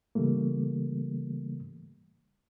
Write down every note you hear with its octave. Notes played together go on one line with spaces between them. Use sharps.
C#3 E3 G3 A3 A#3